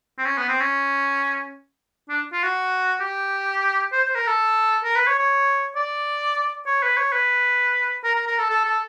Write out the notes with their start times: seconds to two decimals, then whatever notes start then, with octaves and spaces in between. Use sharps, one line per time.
0.18 C4
0.26 C#4
0.38 B3
0.49 C4
0.61 C#4
2.09 D4
2.33 F4
2.43 F#4
3.01 G4
3.92 C5
4.05 C5
4.15 A#4
4.27 A4
4.84 A#4
4.96 B4
5.08 C#5
5.19 C#5
5.76 D5
6.67 C#5
6.83 B4
6.97 C#5
7.12 B4
8.04 A#4
8.15 A#4
8.27 A#4
8.39 A4
8.50 A4
8.65 A4